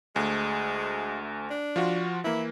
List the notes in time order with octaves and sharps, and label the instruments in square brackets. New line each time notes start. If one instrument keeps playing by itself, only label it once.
[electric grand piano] D2 A3 [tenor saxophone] G#3
[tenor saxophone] D4
[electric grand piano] F3 F4 F#4
[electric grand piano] E3 A#3 [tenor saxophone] E4